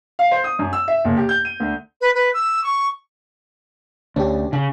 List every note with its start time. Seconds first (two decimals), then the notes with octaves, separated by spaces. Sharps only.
0.19 F5
0.31 C5
0.44 D#6
0.59 F#2
0.73 E6
0.88 E5
1.05 F#1
1.17 G4
1.29 G6
1.45 D#7
1.60 D2
2.01 B4
2.15 B4
2.34 E6
2.64 C#6
4.16 D2 C#4 G4
4.53 C#3